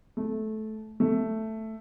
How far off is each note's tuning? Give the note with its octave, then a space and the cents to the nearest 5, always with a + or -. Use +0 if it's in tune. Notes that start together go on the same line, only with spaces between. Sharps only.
A3 -15
A3 +5